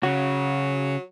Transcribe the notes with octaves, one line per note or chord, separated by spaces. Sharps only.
C#3 F#3 F#4